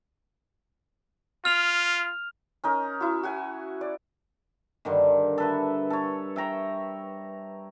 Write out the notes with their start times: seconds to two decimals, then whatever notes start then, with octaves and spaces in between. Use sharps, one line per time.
1.45 F4 F6 F7
2.64 C#4 D#4 A#4
3.01 E4 F#4
3.23 F#4 F#5 G#5
3.81 D5
4.85 G2 D3 D#3
5.38 A4 B4 E5
5.90 A4 C#5
6.36 E5 G5 A#5 C#6